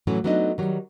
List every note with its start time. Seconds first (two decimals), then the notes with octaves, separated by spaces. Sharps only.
0.07 A2 E3 F#3 A3 C#4
0.24 F#3 A3 B3 D4 D#4 D#5
0.58 D#3 F#3 G3